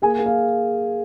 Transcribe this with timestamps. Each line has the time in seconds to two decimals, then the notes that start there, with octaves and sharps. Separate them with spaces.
0.02 A#3 G#4 G#5
0.19 A#3
0.26 F5